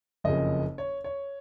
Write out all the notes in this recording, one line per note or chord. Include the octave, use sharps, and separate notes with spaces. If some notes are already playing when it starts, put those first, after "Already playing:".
F#1 F2 C#3 D#5
C#5
C#5